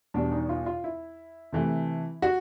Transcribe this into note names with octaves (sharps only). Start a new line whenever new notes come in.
E2 B2 G3 D4
D#4
F4
F4
E4
C3 E3 A3
F#4